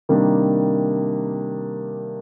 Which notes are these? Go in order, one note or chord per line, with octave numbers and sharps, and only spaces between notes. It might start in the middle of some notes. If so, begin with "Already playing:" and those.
C3 D#3 G3 A#3 D4